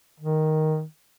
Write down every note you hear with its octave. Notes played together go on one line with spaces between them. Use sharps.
D#3